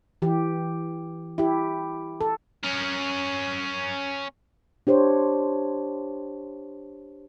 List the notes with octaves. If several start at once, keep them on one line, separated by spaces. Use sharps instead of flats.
E3 G4
E4 G4
A4
C#4 A#4
D4 G4 C5 C#5